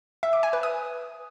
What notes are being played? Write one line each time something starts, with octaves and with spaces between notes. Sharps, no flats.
E5
D6
G#5
B4
D#6